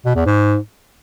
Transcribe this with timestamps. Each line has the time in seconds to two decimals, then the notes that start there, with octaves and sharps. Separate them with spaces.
0.05 B2
0.15 E2
0.26 G#2